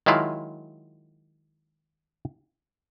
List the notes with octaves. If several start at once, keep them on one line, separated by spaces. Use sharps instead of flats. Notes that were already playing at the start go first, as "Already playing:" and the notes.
D#3 F#3 G#3 E4 F4